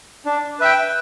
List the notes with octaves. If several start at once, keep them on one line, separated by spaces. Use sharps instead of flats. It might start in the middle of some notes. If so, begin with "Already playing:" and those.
D4
B4 E5 G5